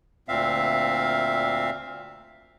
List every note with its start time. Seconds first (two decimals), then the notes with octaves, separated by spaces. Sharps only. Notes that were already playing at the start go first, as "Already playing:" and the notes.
0.28 D2 A#2 C4 E5 F5